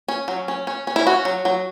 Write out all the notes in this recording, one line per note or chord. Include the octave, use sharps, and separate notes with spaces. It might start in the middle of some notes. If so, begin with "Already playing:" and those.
C#4
F#3
C#4
C#4
C#4
E4
C#4 F#4
F#3
F#3